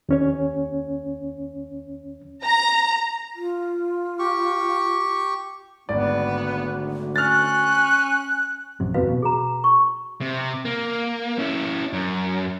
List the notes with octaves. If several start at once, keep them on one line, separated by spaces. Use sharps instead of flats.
D#2 C#4 C#5
A#5
F4
G4 C#6
G#1 D2 B3 D5
C#4 F6 F#6 A6
A#1 F#2 C3
E2 C3 F#4 B4 F5
B2
G#4 A#5
C#6
C3
A#3
C#4 E4
F#2